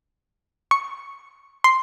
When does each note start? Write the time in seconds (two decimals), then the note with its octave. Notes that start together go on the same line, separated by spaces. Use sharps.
0.71 C#6
1.64 C6